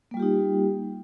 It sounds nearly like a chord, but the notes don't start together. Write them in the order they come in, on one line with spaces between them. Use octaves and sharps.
A#3 G3 F4 G4 D#4